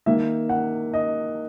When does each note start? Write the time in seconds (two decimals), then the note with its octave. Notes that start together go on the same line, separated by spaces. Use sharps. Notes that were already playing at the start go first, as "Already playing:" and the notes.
0.06 D#3 A#3 E5
0.49 F#5
0.94 D#5